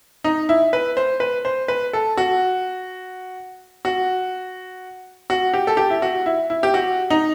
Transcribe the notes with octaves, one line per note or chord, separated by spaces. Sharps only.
D#4
E4
B4
C5
B4
C5
B4
A4
F#4
F#4
F#4
G4
A4
G4
E4
F#4
E4
E4
G4
F#4
D#4